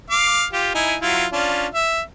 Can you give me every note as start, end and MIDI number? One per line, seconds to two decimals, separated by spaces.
0.10 0.45 77
0.10 0.45 86
0.53 0.71 65
0.53 0.71 67
0.75 0.96 63
0.75 0.96 64
0.75 0.96 80
1.01 1.26 54
1.01 1.26 64
1.01 1.26 65
1.32 1.67 61
1.32 1.67 62
1.32 1.67 65
1.74 2.01 76